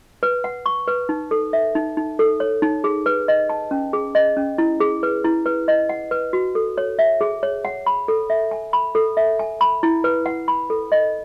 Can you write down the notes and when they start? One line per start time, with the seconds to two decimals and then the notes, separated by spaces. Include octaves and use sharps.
0.23 B4
0.44 F#5
0.66 C#6
0.88 B4
1.09 D#4
1.31 A4
1.53 E5
1.75 D#4
1.97 D#4
2.19 A4
2.40 C#5
2.62 D#4
2.84 G#4
3.06 B4
3.28 D#5
3.50 A5
3.71 C#4
3.93 G#4
4.15 D#5
4.37 C#4
4.58 E4
4.80 G#4
5.03 B4
5.24 E4
5.46 B4
5.68 D#5
5.89 F#5
6.11 B4
6.33 F#4
6.55 A4
6.78 C#5
6.99 E5
7.21 G#4
7.43 C#5
7.65 F#5
7.86 B5
8.08 A4
8.30 E5
8.51 G#5
8.73 B5
8.95 A4
9.17 E5
9.39 G#5
9.61 B5
9.83 E4
10.04 B4
10.26 F#5
10.48 B5
10.70 A4
10.92 D#5